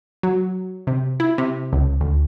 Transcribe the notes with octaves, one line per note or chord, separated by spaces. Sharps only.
F#3
C3
E4
C3
C#2
D2